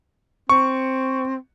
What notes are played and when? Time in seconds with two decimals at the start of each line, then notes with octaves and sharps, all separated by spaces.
0.49 C4 C#6